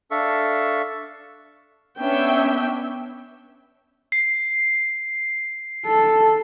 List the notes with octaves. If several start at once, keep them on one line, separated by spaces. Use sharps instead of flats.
D4 A4 E5 F5 C#6
B3 C#4 D4 E5 G5
C7
A4